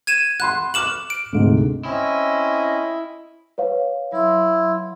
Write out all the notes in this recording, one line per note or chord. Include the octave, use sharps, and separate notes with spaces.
G#6 D#7 E7
F#5 B5 C6 F#6
C#6 D6 F6 F#6 E7 F#7
D7
D2 G#2 C3
C4 C#4 E4 D#5
B4 C#5 F5
F#3 E4 C6